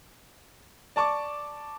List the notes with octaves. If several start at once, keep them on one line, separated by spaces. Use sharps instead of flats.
D5 A5 C#6 D6